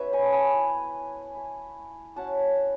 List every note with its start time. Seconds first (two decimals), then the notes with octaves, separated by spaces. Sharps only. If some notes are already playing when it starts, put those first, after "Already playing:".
Already playing: F#3 B3 C#4 D#4 B4 C#5 E5
0.13 G#5 B5
0.23 A5
0.32 G#5 B5
0.53 A3 E4
1.35 A3 E4
2.16 F#3 C#4 E4 F#5 A5